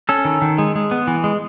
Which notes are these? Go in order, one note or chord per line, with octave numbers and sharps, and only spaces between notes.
C#4 A4
D#3
D#3
G#3
G#3
B3
E3
G#3